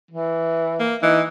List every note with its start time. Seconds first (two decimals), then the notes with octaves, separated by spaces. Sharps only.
0.11 E3
0.80 A#3
1.03 E3 D#4